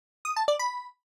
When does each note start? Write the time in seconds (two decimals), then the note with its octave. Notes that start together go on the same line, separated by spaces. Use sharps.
0.25 D#6
0.36 A5
0.48 D5
0.59 B5